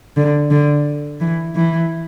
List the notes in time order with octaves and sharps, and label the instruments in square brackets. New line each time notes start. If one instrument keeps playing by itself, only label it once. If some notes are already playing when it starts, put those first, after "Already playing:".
[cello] D3
D3
E3
E3